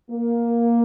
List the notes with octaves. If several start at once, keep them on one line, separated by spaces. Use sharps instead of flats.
A#3